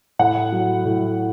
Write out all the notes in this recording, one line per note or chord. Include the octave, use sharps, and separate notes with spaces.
A2 F#5
F#3
A2